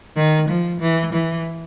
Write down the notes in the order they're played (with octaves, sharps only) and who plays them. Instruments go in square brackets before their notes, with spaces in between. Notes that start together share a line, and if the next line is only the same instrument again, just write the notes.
[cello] D#3
F3
E3
E3